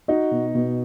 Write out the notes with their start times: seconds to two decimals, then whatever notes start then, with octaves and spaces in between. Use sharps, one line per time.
0.08 D#4 F#4
0.31 B2
0.55 B2